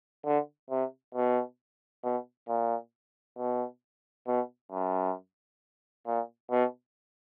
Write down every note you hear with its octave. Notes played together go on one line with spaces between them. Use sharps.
D3
C3
B2
B2
A#2
B2
B2
F#2
A#2
B2